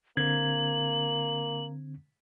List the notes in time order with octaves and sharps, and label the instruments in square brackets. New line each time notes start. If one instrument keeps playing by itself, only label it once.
[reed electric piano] D3 C4 G#6 [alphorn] A#3 [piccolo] F#7